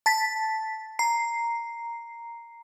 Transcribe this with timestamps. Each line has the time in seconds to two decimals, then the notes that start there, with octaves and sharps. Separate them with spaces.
0.06 A5 A6 B6
0.99 A#5 C7